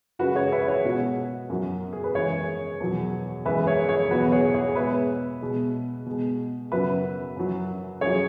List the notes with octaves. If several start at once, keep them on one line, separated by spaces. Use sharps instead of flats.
F#2 C#3 G#3 F#4 B4
G#4 C#5
B4 E5
G#4 C#5
B2 G#3 F#4
F#2 F#3
G#4
B4
F#2 E3 G#3 G#4 C#5
E2 B2 F#3
F#2 E3 G#3 B4 E5
G#4 C#5
G#4 C#5
E2 B2 F#3 F#4 B4
G#4 C#5
G#4 C#5
B2 G#3 B4 E5
B2 G#3
B2 G#3
F#2 C#3 F#3 B4 E5
F#2 F#3
F#2 F#3 G#4 C#5